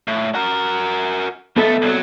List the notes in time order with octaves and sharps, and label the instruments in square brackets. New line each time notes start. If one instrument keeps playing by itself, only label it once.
[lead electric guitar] A2
F#4 A#4
[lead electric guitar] C#2 A3 [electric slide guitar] B3 A4
[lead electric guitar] C2 F#3